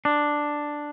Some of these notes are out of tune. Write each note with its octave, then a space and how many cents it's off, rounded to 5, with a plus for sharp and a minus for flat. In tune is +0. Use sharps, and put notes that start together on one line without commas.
D4 +5